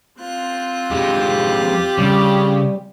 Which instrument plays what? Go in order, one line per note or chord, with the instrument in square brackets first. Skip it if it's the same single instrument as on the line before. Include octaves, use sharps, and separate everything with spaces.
[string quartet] C4 F4 F#6
[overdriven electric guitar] F2 G#3 [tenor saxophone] G4
[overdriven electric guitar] C#3 [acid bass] G3